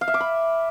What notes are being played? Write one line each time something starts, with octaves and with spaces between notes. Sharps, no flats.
F5
E5
D6
B5